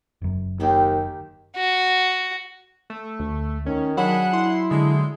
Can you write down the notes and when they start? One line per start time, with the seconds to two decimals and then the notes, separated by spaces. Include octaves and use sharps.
0.22 F#1 F#2
0.60 D#2 D#3 G4 G#4
1.56 F#4
2.90 A3
3.20 D2
3.66 D#3 C#4
3.97 F#3 D4 G#4 F#5 B5
4.33 E4 C6
4.71 D3 G#3